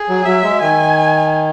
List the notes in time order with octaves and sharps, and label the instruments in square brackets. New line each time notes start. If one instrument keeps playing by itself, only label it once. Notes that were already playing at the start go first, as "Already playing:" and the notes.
Already playing: [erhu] G#4
[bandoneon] F#3
[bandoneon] F#3 [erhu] E5
[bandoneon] G#3
[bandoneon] D#3 [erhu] G#5